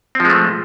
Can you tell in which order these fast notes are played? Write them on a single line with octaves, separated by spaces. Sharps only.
C4 F3 G#3 A3